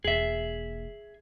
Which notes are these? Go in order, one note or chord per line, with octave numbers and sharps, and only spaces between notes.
E1 A#3 G#4 E5